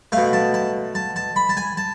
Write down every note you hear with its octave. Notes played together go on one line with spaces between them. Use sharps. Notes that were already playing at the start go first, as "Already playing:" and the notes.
B2 A3 F5
A5
A5
A5
A5
B5
A5
G#5
A5